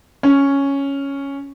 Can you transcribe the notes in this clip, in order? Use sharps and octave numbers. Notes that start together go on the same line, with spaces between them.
C#4